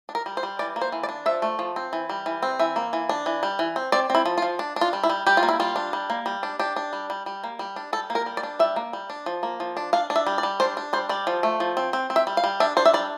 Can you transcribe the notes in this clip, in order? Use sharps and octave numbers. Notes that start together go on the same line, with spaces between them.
D4
A#4
G3
C5
G3
E3 D5
A#3
C5
E3
D5
D4
F3 E5
A3
F3
C4
E3
G3
E3
C4
E3 E5
A#3
E3
D4
E3
G3
E3
C4
C4 D5
C4 E4
F3
F4
F3
D4
D4
F4
G3
E4
G3
G3 G4
F4
A#3
E4
G3 F4
D4
G3
A#3
G3
D4
D4 G4
D4
G3
G3
G3
A#3
G3
D4
G3 A4
A#3
A#4
G3
D5
D4
G3 E5
A#3
G3
D4
F3
A#3
F3
D4
D4 F5
D4
E5
G3
D5
G3
D4 C5
D4
G3 C5
G3 D5
F3
A3
F3
C4
C4
C4
E5
G3
F5
G3
D4 E5
D4 C5
E5
G3 D5